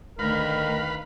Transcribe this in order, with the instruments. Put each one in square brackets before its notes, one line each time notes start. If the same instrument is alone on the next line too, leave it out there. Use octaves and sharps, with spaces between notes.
[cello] D2 [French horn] D#3 [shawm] A#4 [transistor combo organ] B4 F5 B5